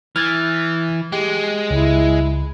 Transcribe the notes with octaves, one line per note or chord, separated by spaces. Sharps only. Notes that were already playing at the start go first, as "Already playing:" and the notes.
E3 F6 G#6 A6
G#3 G4
C#2 E4